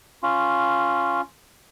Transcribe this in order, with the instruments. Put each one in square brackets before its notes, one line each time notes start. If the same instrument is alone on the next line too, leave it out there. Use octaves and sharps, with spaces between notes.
[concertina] C#4 F4